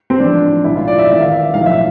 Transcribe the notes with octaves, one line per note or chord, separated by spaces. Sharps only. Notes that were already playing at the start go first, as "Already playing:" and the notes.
C4
A1 G#2 F3 D4
B1 A2 E3 E4
F4
D5
E5
G#1 G#2 E3 E5
F5
E5
B1 A2 F3 F5
E5